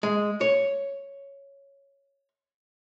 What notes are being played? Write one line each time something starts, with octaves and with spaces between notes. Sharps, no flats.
G#3
C#5